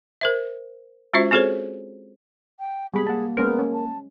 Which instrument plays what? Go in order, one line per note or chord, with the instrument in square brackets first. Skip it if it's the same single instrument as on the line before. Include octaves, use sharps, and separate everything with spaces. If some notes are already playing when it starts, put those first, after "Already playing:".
[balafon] A#4 C5 E5
G#3 C#4 F4 F#4 C5 E5
C4 F#4 G#4 A4 C5 C#5
[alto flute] G5
[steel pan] G3 G#3 B5 [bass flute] B3 [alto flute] G#4
[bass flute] A#3 [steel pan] F#5 A5
[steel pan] G#3 C#4 C5 [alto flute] B3 [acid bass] A#4
[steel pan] C#4
[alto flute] A5